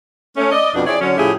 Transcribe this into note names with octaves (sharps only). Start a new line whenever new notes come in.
A3 C#4
D5 D#5
F2 B2 D4
C4 E4 G#4 C#5 D5
D3 F#3 C#4
A2 C#3 F3 E4 G4 G#4